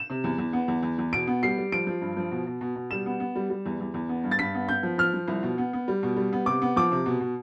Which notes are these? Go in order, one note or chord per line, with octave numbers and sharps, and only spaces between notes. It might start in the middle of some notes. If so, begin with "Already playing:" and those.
Already playing: E7
C3
E2
E2
B3
E2
E2
E2
B2 D7
B3
G3 C7
G3
F3 D7
F3
G2
F3
B2
B2
B2
B2
G3 E7
B3
B3
G3
G3
E2
E2
E2
B3
G2
A6
G2 B6
B3
B3 G6
F3
F3 F6
F3
C2
B2
B3
B3
G3
B2
G3
B3
C3 D6
B3
F3 D6
C3
B2
B2